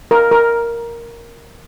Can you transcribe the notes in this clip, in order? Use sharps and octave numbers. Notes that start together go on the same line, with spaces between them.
A#4
A#4